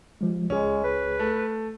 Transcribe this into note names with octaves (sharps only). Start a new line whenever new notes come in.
F3 G#3
C#2 G#3 C#4 G#4
B4
A3